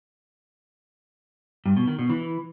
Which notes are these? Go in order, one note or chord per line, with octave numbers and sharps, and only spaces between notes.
G2
B2
D#3
B2
E3